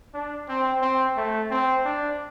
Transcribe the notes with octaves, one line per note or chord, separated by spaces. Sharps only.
D4
C4
C4
A3
C4
D4